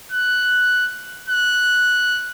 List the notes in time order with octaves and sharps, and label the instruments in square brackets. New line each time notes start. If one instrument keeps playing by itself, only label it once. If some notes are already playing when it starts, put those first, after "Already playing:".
[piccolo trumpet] F#6
F#6